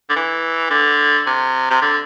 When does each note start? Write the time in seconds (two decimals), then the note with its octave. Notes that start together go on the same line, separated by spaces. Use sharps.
0.09 D3
0.16 E3
0.70 D3
1.26 C3
1.70 C3
1.82 D3